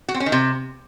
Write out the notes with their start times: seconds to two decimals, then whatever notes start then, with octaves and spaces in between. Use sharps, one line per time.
0.09 F#4
0.14 C4
0.20 C#4
0.26 D#3
0.32 C3